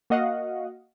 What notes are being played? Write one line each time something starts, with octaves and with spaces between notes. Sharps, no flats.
A#3 F#4 D#5 F5 F#5